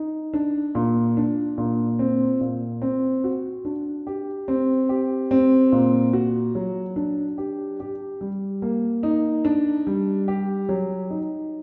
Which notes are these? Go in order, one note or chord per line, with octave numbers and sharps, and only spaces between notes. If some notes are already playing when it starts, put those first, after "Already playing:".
Already playing: D#4
D4
A#2
D4
A#2
C4
A#2
C4
F#4
D4
G4
C4
G4
C4
A#2
F#4
F#3
D4
G4
G4
G3
A#3
D#4
D4
G3
G4
F#3
D#4